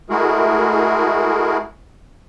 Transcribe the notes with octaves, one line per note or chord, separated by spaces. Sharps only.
G#3 A3 E4 F#4 G#4 A#4